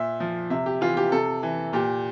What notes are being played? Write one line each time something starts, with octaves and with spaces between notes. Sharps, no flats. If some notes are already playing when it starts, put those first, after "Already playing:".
Already playing: A#2 E5
F3
C3 E5
G4
E3 F4
G4
C3 A4
E3
A#2 G4